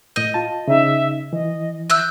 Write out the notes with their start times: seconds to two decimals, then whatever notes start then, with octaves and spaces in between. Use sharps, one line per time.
0.16 A2 D#5 G6
0.34 F4 A5
0.68 C#3 D#4 E5
1.33 E3 D#5
1.90 E5 E6 F#6 G6